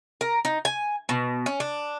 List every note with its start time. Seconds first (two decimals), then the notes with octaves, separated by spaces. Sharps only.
0.21 A#4
0.45 D#4
0.65 G#5
1.09 B2
1.46 C#4
1.60 D4